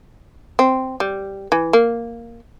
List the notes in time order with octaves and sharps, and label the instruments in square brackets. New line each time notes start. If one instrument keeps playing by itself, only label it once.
[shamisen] C4
G3
E3
A#3